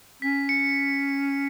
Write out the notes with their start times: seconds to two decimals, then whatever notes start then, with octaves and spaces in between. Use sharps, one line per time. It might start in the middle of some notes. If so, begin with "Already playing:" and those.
0.22 C#4 B6
0.49 C#7